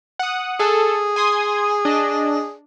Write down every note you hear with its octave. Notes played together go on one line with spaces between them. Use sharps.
F#5 D#6
G#4 A4
G#5 C6 D#6
D4 D#5